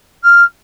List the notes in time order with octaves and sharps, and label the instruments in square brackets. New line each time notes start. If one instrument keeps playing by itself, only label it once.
[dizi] F6